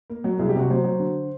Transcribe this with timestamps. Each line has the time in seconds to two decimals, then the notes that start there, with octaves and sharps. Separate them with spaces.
0.10 A#3
0.24 F#3
0.39 C2 G#4
0.49 G4
0.55 C3 F#4
0.70 F#3 C5
0.84 F#3
1.00 D3